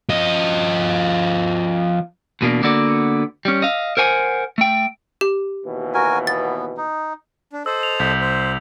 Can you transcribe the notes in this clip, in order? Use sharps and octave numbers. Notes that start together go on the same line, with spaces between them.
F3 D#5
E2 B2 A#3 D4
D3 A#3 B3 F#4 D5
G3 C#4
D#5 F5
A#4 C5 F#5 G#5
A3 G5
G4
D#2 B2 E3
F#4 A#4 G#5
B3 A6
D#4
D4
A4 C5 D#5 E6
F7
C2 G6 B6
C5